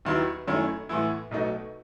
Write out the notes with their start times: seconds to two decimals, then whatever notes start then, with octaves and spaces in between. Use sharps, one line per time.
0.05 D#2 D#3 F#3 B3 E4
0.47 F#2 D#3 A3 C#4 E4
0.89 A2 E3 B3 E4
1.31 B1 B2 A3 D#4